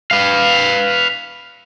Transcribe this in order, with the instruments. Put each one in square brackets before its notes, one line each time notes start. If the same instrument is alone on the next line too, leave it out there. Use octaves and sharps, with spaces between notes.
[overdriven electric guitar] B4 F5